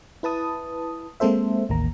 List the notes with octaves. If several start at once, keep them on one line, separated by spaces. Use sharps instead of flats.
E4 B4 A5 D#6
G#3 A#3 C4 A4 C5 E5
A1 D#2 A#3 A#5